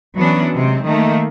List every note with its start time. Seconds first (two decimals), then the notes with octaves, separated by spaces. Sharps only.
0.16 E3 F#3 B3 C#4 D4
0.53 C3 G#3 C4
0.84 D#3 A3 A#3